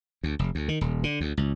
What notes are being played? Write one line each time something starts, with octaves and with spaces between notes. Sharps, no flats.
D2
F1
D2
D#3
D#1
D3
D2
C#2